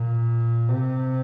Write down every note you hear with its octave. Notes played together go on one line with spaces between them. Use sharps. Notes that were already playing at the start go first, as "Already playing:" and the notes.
Already playing: A#2
C3